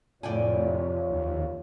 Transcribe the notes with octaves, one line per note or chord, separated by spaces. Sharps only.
F2 A2 C3 F4 C#5 D5 G5 G#5
D#2